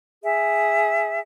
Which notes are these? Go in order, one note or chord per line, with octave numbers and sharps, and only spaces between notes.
G#4 E5